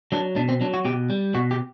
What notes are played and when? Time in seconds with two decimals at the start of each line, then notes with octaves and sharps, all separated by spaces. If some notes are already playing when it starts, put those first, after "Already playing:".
0.12 F#3 D4
0.36 B2 D4
0.49 C4
0.61 F#3 D4
0.74 F#4
0.85 B2 G4
1.10 G3
1.35 B2 F#4
1.51 G4